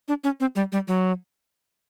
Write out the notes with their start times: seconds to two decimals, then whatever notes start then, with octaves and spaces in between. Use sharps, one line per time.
0.08 D4
0.24 C#4
0.40 C4
0.56 G3
0.72 G3
0.88 F#3